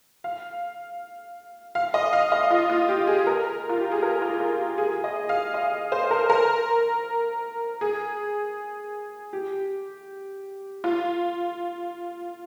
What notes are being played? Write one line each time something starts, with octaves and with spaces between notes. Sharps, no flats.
F5
F5
D#5
F5
D#5
F4
F4
G4
G#4
A#4
F4
G4
G#4
A#4
F4
F4
G4
G#4
D#5
F5
D#5
C5
A#4
A#4
G#4
G4
F4